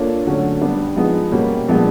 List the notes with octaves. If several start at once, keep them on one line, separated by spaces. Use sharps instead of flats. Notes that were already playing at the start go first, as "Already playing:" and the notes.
Already playing: A#3 D4 F4 A4 C#5
D3 F#3 A3 C#4
G3 B3 D4
F3 G#3 B3 D#4 G#4
B2 G3 A#3 C#4
A#2 F3 G#3 B3 D4